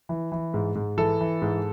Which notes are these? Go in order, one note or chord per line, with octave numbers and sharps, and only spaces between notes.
E3
E3
G#2
G#2
E3 A4
E3
G#2